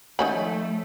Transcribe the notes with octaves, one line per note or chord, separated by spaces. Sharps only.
D#3 F3 A3 C#4 B5